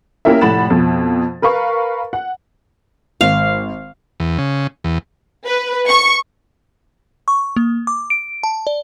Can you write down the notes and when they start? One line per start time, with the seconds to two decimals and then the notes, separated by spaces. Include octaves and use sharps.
0.25 A#3 C#4 E4 G4 A#4 E5
0.41 F1 A2 F#5 B5 A6 E7
0.70 F2 B2
1.42 A#4 B4 F5 C#6
2.13 F#5
3.21 G#1 F5
4.20 E2
4.38 C#3
4.84 E2
5.46 B4
5.88 C#6
7.28 C#6
7.56 A#3
7.87 D6
8.10 D7
8.43 A5
8.67 D5